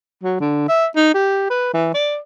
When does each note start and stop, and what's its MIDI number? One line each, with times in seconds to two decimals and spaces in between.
0.23 0.36 54
0.40 0.67 50
0.68 0.86 76
0.96 1.14 63
1.14 1.49 67
1.50 1.72 71
1.73 1.90 52
1.94 2.18 74